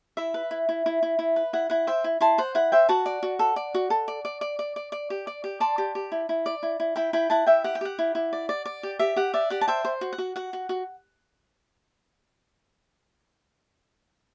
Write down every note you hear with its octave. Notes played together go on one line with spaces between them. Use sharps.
E4 E5
B4
E4
E4
E4
E4
E4
B4
E4 F#5
E4 F#5
C5 E5 G5
E4
E4 A5 C6
C5 F#5
E4 F#5
C5 E5 G5
F#4 F#5 A5
D5
F#4
A4
D5
F#4
A4
D5
D5
D5
D5
D5
D5
G4
D5
G4
D5 A5 C6
G4
G4
E4
E4
D5
E4
E4
E4 G5 B5
E4 G5 B5
E4 F#5 A5
E4 E5 G5
G4 F#5
G5
G4 F#5
E4
E4
D5
D5
D5
G4
G4 E5
G4 F#5
D5 E5
G4 F#5
A5
C5 E5 G5
C5
F#4
F#5
F#4
F#4 F#5
F#4
F#4